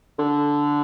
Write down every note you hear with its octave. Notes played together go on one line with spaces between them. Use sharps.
D3